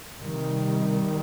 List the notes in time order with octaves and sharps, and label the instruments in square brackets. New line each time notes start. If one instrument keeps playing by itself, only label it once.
[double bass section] C3 D#3 G3